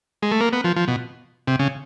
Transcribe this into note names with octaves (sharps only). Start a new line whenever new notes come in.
G#3
A3
A#3
B3
F3
F3
B2
C3
C#3